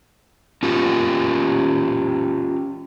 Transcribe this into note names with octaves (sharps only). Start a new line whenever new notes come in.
C#4 F4 G4